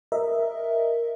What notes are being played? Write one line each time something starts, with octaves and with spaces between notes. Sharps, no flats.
A#4 D#5 E5